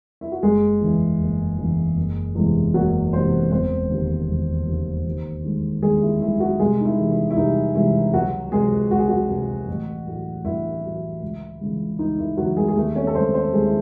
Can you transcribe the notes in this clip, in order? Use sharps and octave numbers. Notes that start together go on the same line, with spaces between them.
E4
F#4
F#1 G#3 G#4
E2 C#3 E3
F#1
E2 C#3 E3
F#1
E2 C3 E3 G#3
F#1 F#3 F#4
E2 C3 E3 G#3 C4 C5
E1 C4 C5
D#2 C#3
E1
D#2 C#3
D#2
D#3 G#3
D#2 G#3 G#4
E4
D#3 G#3 E4
F#3 F#4
C2 G#3 G#4
D#4
E4
C3 E3 G#3
E4
E4
C2 D#4
C3 E3 G#3 E4
C#2 F#3 F#4
C3 F#3 G#3 G#4
C#2 F#4
G#4
F#3 F#4
C3 F#3
A1
A2 F#3
A1 E4
A2 F#3
C#2
C#3 E3 G#3
C#2 D#4
E4
C#3 E3 F#3 G#3 F#4
G#3 G#4
G#4
D#2 A3 A4
C#4 C#5
A4
C#3 G#3 C4 C5
C4 C5
D#2 G#3 G#4
E4